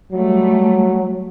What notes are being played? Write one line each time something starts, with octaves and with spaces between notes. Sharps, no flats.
F#3 G3 A3